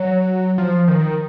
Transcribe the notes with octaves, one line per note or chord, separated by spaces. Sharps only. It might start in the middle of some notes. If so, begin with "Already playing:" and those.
Already playing: F#3
F3
D#3